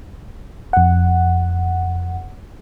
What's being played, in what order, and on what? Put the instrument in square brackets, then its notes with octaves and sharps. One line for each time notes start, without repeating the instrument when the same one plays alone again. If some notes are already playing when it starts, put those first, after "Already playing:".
[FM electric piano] F2 F#5